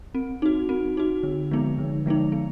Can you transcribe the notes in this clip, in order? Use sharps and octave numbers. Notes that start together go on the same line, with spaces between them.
C4
D#4 F#4
C4
D#4 F#4
D3
F3 G#3 B3 D#4
D3
F3 G#3 B3 D#4
B3